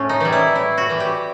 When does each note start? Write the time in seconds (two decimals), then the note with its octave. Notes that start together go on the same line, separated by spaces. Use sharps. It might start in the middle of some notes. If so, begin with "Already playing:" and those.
Already playing: A2 C#4
0.09 D#4
0.20 E3 G3
0.32 E4
0.55 A2 E4
0.77 F#4
0.89 E3 G3
1.00 G4